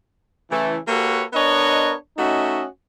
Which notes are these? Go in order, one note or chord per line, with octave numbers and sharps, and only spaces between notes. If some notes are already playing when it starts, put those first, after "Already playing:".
C#3 E3 A3
A#3 F#4 G4 A4 B4 C#5
B3 D4 A#4 C#5 D#5
A3 C#4 D#4 F#4 D#5 E5